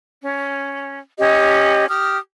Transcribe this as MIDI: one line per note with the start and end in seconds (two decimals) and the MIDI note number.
0.23 0.99 61
1.18 1.87 61
1.18 1.87 67
1.18 1.87 75
1.88 2.18 67
1.88 2.18 87
1.88 2.18 89